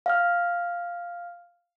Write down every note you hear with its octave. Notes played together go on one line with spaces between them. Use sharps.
F5 F6